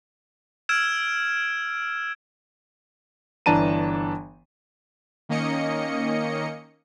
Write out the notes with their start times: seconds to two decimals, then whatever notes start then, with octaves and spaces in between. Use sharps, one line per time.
0.69 E6 F6 G#6 D7 E7
3.46 G1 E3 D4 A5 A#5 D#7
5.29 D#3 A#3 C#4 D#5 C#7